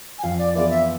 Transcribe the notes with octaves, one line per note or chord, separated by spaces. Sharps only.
G#5
F2 F5
D5
E3 B3 F4 G#4 D5
E5